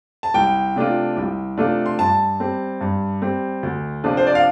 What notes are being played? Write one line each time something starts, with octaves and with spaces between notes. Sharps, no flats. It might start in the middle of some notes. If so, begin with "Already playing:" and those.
A5
C2 G5
C3 A3 D4 F4
C2
C3 A3 D4 F4
C6
G2 A5
G3 C4
G2
G3 C4
D2
C3 F3 D4 F4
C5
D5
F5